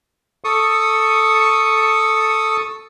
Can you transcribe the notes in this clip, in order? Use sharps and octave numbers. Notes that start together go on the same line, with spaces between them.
A4 C#6 D#6